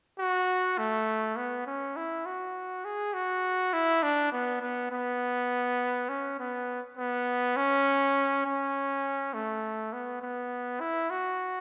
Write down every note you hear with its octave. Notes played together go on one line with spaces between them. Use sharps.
F#4
A3
B3
C#4
E4
F#4
G#4
F#4
E4
D4
B3
B3
B3
C#4
B3
B3
C#4
C#4
A3
B3
B3
E4
F#4